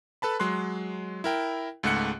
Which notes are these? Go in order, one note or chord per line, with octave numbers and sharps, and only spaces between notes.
A4 B4 A5 B5
F#3 G#3 C6 F#6
E4 A#4 G5
C#2 G#2 A3 F#5 F#6 C#7